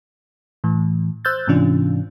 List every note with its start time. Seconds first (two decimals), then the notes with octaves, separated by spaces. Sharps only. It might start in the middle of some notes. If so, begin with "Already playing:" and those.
0.64 A2 E3
1.25 C5 E6 F#6 G6 A6
1.47 G#2 C3 E3 C#4 D4 F4